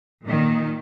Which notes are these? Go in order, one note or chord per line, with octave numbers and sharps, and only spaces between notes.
A#2 D#3